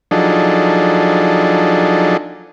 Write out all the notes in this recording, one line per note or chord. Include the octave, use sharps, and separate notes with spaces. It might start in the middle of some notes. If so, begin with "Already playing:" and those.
F3 F#3 D4 D#4 G#4 A4